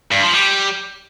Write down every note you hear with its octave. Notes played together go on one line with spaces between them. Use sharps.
G2
F3
G3